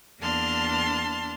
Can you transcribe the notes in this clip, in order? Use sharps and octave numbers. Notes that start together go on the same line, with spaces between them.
E2 A#3 D4 A5 C6 F6